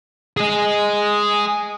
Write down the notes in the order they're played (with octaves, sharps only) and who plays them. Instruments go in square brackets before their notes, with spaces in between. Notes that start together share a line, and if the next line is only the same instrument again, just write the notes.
[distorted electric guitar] G#4 D#5